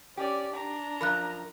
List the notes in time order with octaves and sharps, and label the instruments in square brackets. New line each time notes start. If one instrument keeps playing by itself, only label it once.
[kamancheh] C#4 D5 [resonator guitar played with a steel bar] G4
[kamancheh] D4 A#5
[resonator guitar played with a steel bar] F#2 F3 A#4 [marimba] B5 F#6